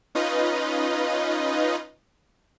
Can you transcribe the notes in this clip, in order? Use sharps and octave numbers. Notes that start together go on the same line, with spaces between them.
C#4 D#4 F4 B4 D#5